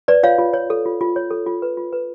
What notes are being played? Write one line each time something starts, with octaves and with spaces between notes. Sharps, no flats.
B4 D5
F4 C#5 F5
F4
C#5
A4
F4
F4
C#5
A4
F4
B4
F4
B4